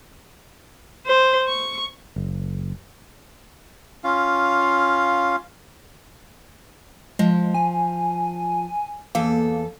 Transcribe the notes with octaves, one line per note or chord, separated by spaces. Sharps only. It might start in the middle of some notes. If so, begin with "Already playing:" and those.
C5
C#6
F#1
C#4 F4 F5
F3 G#3
G#5
E2 A#3 A4